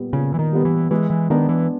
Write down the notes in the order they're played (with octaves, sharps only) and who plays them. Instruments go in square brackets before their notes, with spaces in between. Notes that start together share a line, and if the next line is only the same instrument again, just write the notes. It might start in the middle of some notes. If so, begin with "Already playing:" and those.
Already playing: [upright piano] A#2 G3 B3
[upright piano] A#2 [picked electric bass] C#3
[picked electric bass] E3
D#3
[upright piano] G3 B3
[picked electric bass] E3
[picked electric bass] E3 [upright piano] G#3
[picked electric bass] E3
[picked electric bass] D#3 [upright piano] B3 D4
[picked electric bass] E3